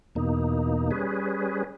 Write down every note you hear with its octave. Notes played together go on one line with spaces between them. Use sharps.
E2 B2 A#3 D#4
G3 C#4 G#4 B4